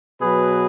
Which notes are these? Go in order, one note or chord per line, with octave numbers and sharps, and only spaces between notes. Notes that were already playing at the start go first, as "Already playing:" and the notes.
B2 F#3 G#4 B4